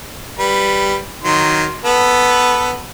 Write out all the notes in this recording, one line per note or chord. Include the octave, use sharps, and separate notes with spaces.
G3 B4
D#3 F#3 C6
B3 A4 B4